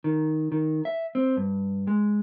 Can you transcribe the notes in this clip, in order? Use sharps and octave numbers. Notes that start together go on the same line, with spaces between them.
D#3
D#3
E5
C4
G2
G#3